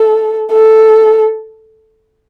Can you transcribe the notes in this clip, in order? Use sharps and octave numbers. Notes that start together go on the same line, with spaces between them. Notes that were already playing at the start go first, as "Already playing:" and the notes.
Already playing: A4
A4